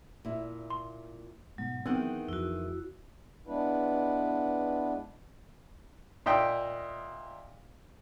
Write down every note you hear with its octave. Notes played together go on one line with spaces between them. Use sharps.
A#2 E4
C6
G#2 B2 F#3
D#3 E3 G#3 B3 C4 G5 F#6
F2 E4 F#4
G#3 B3 D4 E4 B4
A#2 D#5 E5 G5